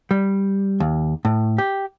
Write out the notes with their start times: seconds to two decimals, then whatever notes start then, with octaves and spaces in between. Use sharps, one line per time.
0.11 G3
0.80 D#2
1.25 A2
1.58 G4